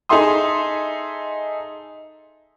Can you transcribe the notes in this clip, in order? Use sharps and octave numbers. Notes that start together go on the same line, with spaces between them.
D#4 G#4 A4 E5 C6 D#6